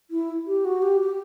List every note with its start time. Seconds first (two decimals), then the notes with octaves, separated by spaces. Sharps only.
0.11 E4
0.47 G4
0.65 F#4
0.82 G4
1.00 G4